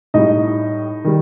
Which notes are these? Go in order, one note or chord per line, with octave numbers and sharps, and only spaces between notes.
A2 G3 D#4 D#5
D#3 G3